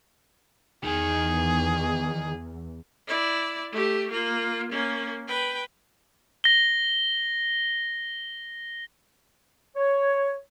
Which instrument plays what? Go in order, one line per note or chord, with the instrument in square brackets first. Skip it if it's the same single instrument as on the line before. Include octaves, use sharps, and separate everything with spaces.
[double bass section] E2 [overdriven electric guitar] D#3 [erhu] G#4
[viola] E4 D5
A3 G4
A#3 F4
A#3 C#4
B4 G5
[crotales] A#6 G7
[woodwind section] C#5